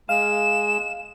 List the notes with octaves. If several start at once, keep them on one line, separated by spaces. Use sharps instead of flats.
G#3 F5 E7